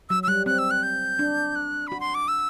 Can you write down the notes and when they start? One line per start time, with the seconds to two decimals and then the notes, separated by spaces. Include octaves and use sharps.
0.10 F#3 E6
0.23 E6
0.28 G3 F#6
0.46 C4 F#6
0.58 E6
0.71 F#6
0.83 G6
1.19 D4
1.55 F#6
1.87 F#4 B5
2.00 C6
2.14 D6
2.28 E6